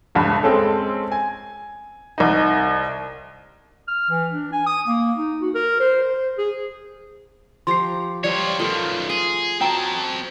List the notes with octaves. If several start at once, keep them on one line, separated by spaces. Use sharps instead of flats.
D#1 C#2 G2 B5
G#3 C4 C#4 A4
G#5
C2 D#4
F6
E3
D4
G#5
D#6
A#3
D#4
F#4
A#4
C5
C5
G#4
F3 G4 A#5 C6 C7
F3 G3 F4 C#5 D5 E5
F#2 D#3 A3 F4 B4
G#4 C6
C4 C#4 F#4 C#5 G5 A5 A#5